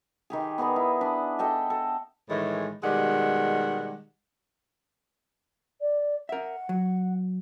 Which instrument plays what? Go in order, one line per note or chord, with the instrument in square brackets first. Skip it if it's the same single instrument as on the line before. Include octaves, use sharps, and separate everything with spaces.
[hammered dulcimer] D#3 G4 G#4
B3 G#4 A#4 D5
E4
D4 B5
A4 D#5 G5 A5
A4
[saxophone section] A2 D#3 E3 G#3
B2 D#3 G3 G#3 F#5
[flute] D5
[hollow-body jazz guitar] A#4 E5 [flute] F#5
[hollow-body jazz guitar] F#3